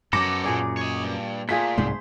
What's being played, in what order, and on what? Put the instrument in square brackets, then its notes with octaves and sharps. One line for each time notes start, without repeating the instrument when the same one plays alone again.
[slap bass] F#2 [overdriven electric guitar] B3 A4 [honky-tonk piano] D6 A#6 C#7
[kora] A#2 G#4 D5
[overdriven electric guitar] C#5 D#5
G2
[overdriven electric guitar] A#2 [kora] A3 G#4 [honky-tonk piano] F4 B6
[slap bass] C2 G#2 G#3 [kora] C5